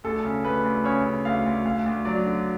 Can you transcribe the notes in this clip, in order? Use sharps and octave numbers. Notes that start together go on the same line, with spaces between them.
D2 A4
C#3
D2 B4
D2
C#3 C#5
C#3
D2 F5
D2
D2 F5
D2
F#3 D5
D3